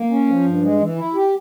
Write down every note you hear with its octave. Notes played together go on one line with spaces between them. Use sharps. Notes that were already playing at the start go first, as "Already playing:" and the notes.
Already playing: A#3
C#4
F3
G2
G#3
E3
E4
G4